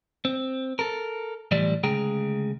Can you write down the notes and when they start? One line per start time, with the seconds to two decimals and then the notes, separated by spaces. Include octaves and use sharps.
0.25 C4
0.79 A4 A#4
1.51 B1 A2 E3 F3 G3 D5
1.84 D2 C#3 G#3 G#4 G5 A#5